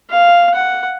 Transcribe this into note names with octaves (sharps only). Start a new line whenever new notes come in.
F5
F#5